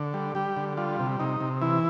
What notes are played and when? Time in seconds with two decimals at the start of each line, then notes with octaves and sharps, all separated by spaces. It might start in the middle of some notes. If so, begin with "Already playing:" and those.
Already playing: D3
0.14 G3
0.35 G3 G4
0.57 D3
0.77 G3 F4
0.99 C3
1.20 C3 D#4
1.40 C3
1.62 E3 E4